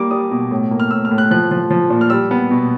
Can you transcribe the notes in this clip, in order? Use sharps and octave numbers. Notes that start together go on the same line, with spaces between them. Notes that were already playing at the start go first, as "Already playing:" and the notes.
Already playing: G3 A#3 D6
G3 D#6
B2
A2
A#3
F6
A2 E6
F6
A2
F#6
F3 F#6
F3
F3
A#2
F6
G3 E6
B3
B2